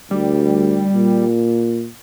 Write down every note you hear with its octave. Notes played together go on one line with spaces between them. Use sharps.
D2 G3
A#2